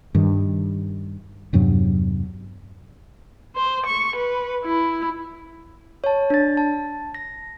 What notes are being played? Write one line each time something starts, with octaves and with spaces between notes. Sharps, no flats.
G2 D#3
E2 G2 C3 F#3
C5
C#6
B4
E4
C#5 A5
D4 A6
A5
A#6